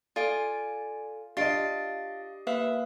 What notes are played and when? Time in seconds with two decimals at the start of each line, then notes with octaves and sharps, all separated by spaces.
0.16 F4 A4 D5 G#5 D7
1.37 D4 F4 G4 D#5 A6 C7 D7
2.47 A#3 B4 E5 F5